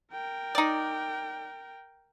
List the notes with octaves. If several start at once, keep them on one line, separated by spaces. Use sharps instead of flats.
A#4 G5
D#4 D5